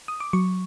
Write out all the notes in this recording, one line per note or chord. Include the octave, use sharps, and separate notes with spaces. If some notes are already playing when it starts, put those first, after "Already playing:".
D#6
D6
F#3 C#6